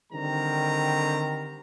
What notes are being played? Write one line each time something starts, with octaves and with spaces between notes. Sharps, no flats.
D3 D#3 G3 C4 A#5